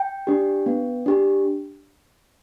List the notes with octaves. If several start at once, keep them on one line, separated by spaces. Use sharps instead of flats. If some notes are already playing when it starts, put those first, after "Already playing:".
Already playing: G5
D4 G4
B3
D4 G4